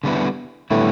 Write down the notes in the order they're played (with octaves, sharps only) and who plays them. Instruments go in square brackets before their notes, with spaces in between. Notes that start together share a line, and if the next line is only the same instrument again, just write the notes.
[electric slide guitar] D3 G3 B3 E4
[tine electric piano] A2 A3 [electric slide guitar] D3 G3 B3 E4